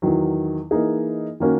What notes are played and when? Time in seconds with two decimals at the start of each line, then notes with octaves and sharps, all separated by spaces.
0.02 E2 D#3 F#3
0.71 E3 A#3 D#4 G#4
1.40 D#3 A#3 C#4 F#4